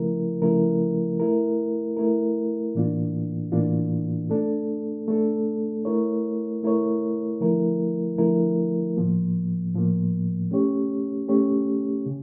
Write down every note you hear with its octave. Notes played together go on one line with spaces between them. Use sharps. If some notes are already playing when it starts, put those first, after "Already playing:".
Already playing: C#3 F3 A3 E4 A#4
C#3 F3 A3 E4 A#4
A3 E4 A#4
A3 E4 A#4
A2 E3 A#3 D4 F4
A2 E3 A#3 D4 F4
A3 D4 A4
A3 D4 A4
A3 E4 A#4 C#5
A3 E4 A#4 C#5
D3 F3 A3 E4 A#4
D3 F3 A3 E4 A#4
A2 F3 A#3
A2 F3 A#3
A3 C#4 G4 C#5
A3 C#4 G4 C#5
C#3